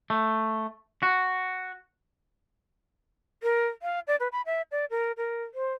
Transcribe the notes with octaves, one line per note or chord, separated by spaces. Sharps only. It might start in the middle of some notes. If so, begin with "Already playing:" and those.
A3
F#4
A#4
F5
D5
B4
B5
E5
D5
A#4
A#4
C5